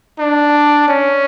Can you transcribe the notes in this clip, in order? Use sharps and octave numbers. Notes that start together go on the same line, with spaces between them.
D4
C#4